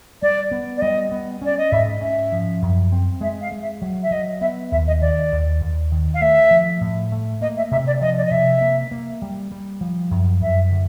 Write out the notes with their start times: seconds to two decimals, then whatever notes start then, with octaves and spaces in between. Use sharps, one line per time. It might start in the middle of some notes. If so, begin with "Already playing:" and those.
0.22 G3 D5
0.51 B3
0.77 D5
0.81 G3 D#5
1.11 B3
1.42 C#4 D5
1.58 D#5
1.72 G#2 E5
2.01 C#4 E5
2.32 F3
2.62 F#2
2.92 C4
3.21 G#3 E5
3.41 F5
3.52 G#3
3.62 E5
3.82 F#3
4.03 E5
4.11 F#3 D#5
4.41 B3 E5
4.71 D#2 E5
4.87 D#5
5.01 D#3 D5
5.32 D#2
5.61 D#2
5.92 D#3
6.14 F5
6.21 A3 E5
6.51 F3
6.81 A2
7.12 A3
7.41 A#3 D#5
7.57 E5
7.71 C3 E5
7.87 D5
8.01 F3 D#5
8.17 D5
8.25 D#5
8.31 C3 E5
8.61 A#3
8.91 A#3
9.22 G3
9.52 G3
9.81 F3
10.11 F#2
10.41 F#2 E5
10.71 D3